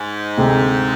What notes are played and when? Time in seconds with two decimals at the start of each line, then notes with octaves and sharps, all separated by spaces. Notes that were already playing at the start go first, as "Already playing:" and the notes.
Already playing: G#2
0.38 D2 C3 G#3